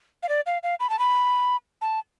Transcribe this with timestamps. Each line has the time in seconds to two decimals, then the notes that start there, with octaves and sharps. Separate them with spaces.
0.23 F5
0.29 D5
0.46 F5
0.63 F5
0.80 B5
0.89 A5
0.99 B5
1.81 A5